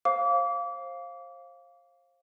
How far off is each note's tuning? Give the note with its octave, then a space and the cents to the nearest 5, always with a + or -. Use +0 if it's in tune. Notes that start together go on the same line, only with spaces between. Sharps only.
C5 +30 F5 +0 D6 -30